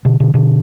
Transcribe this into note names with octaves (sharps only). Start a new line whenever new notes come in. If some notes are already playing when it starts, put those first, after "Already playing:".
B2 D3
B2 D3
B2 D3